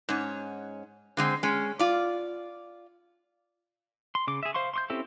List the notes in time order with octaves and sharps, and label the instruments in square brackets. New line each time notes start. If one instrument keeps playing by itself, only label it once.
[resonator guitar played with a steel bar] G#2 C#4
D3 G#3 C4
G#3 C#4
F4 D5
[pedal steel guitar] C6
C#3 D6
G#4 E5
C5 F5 C6 C#6
C6 C#6 G6
C4 C#4 E4 G4 A4